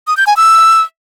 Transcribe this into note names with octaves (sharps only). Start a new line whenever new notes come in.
D#6
G6
G#5
E6